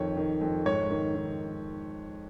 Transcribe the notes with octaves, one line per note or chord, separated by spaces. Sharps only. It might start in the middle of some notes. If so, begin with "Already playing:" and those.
Already playing: F2 D#3 C#5
D#3
F2
G#2 C#5
D#3
D#3